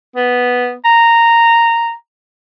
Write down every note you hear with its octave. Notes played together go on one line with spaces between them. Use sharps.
B3
A#5